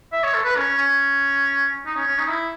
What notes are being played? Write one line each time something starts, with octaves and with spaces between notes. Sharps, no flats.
E5
C#5
A4
B4
C#4
C#4
D#4
C#4
C#4
D#4
E4